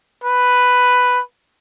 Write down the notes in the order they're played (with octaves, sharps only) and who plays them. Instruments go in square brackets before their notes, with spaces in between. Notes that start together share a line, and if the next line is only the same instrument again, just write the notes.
[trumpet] B4